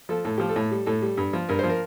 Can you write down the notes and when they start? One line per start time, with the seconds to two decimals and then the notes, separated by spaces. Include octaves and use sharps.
0.09 F3 A4
0.25 A2 A4
0.38 F3 G4
0.49 A4
0.56 A2
0.71 G3
0.86 A2 A4
1.02 G3
1.17 G2
1.33 F3
1.49 G2 A#4
1.59 C5
1.64 F3
1.69 A#4